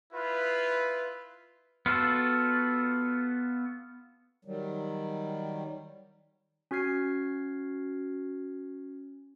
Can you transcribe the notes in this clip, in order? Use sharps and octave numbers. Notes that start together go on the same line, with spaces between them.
E4 F4 B4
B3 F4 F#4 A4
D#3 F#3 G3
C#4 F#4 F6 G#6 C7